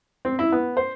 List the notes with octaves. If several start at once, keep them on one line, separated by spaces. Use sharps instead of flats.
C4
E4
B3
C5